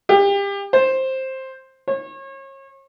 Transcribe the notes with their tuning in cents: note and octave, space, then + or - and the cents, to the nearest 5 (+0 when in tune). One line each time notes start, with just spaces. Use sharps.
G4 +30
C5 +10
C#5 -35